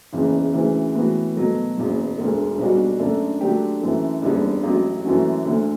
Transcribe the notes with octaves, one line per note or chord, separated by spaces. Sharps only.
F#1 E2 C#3 E3
D2 C#3 E3
A2 E3 B3 F#4
B2 F#3 A3
F#1 E2 B2 F#3
E1 D2 D3 A3
B1 B2 G3 D4 F#4
F#2 D3 A3 D4
D3 F#3 A3 D4 G4
F#2 E3 A3
F#1 E2 D3 G3
A1 A2 F#3
F#2 E3 A3 C#4 F#4
D2 D3 A3